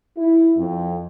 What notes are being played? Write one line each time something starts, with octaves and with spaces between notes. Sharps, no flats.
E4
F2